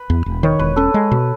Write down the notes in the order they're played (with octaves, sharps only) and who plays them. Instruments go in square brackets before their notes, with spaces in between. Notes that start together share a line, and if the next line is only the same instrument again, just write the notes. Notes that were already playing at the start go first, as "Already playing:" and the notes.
Already playing: [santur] B4
[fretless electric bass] E2
E1
[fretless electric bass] D#3 [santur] C#5
[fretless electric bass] E1 [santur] B4
[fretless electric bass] C#4 [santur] A4
[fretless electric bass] G#3
B2